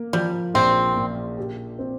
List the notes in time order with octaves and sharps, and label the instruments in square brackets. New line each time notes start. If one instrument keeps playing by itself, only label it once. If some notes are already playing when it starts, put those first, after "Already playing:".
Already playing: [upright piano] A#3
[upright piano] F3 [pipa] G3
[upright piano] A#1 [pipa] C4
[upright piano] A#2
G4
C4